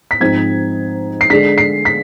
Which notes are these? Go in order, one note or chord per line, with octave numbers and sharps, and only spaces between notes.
B6
G#2 F3 C4 D#4 G#6
C7
D3 G#3 D4 B6
C7
B6